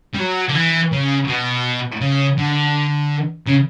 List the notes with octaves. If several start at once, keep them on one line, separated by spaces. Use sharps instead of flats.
G3
F#3
D3
E3
C#3
B2
C#3
D3
C#3